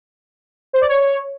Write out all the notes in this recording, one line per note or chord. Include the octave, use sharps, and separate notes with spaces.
C5
D5
C#5